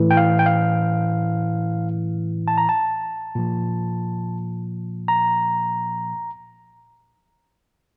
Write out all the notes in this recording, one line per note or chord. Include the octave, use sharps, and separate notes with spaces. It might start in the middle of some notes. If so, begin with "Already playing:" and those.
Already playing: A2 E3
G5
F5
G5
F5
A5
A#5
A5
A#2 F3
A#5